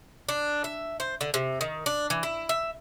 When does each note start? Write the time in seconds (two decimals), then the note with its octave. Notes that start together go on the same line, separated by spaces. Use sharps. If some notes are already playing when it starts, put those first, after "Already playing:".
0.29 D4
0.64 E5
1.00 C5
1.21 D3
1.34 C3
1.61 D#3
1.86 D4
2.10 E3
2.23 E4
2.49 E5